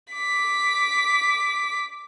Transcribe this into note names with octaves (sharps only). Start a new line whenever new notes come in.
D6 B6